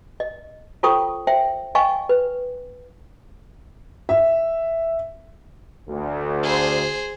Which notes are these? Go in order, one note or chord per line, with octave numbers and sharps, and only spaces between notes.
D#5
F4 A4 C5 G5 C#6 D#6
C5 E5 G5
D#5 F5 G5 G#5 C#6
B4
E5
D2
G#4 C5